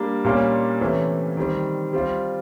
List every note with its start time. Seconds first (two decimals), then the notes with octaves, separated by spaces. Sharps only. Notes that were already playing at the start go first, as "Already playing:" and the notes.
Already playing: G3 A#3 D4
0.24 A#2 G3 A#3 C#4
0.81 C3 E3 A3 C#4
1.37 D#3 G3 C4
1.93 G3 C4 F4